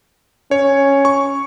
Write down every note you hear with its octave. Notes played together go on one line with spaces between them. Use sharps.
C#4 C#5
C#6